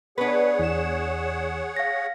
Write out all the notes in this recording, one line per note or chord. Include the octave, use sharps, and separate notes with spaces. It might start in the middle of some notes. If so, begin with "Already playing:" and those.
B3 D4 G#4 B4 C#5 F#5
E2 E7
F5 A#6